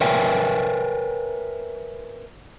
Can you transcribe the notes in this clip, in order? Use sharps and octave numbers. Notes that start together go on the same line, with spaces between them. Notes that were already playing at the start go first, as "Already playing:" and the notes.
A#4 B4 C#5 E5 G5 G#5